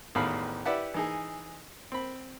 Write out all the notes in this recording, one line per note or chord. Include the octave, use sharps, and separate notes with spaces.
A1 E2 A2 D#3 F5 B5
E4 G4 B4 D5 E5 F#5
E3 D#4 G#4
C4 B5